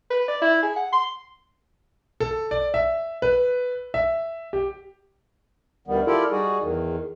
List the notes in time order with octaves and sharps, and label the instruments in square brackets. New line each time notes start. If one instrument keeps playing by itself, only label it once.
[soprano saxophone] B4
D5
E4
G#4
F#5
C6
[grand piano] A4
D5
E5
B4
E5
G4
[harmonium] D2 D#3 G3 B3
E4 F4 G4 A4 A#4 D5
G3 D#4 F#4 G#4
E2 D#3